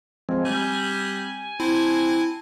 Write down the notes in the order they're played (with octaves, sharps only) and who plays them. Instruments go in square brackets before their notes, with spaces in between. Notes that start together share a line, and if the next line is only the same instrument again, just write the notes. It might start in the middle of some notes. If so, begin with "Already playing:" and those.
[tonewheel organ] F3 G#3 [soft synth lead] C4
[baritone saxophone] G3 [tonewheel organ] G#5
[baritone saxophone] C4 [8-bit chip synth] E4 [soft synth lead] A5